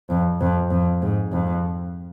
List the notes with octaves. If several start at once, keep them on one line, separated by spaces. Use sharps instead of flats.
F2
F2
F2
G#2
F2